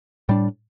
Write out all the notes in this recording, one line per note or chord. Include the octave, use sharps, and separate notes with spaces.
A2 G3 D4